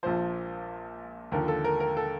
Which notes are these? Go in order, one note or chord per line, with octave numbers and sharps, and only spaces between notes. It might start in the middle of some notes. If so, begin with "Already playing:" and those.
A#1 A#2 F3 C5
D#2 D3 F3 A#4
A4
A#4
A#4
A4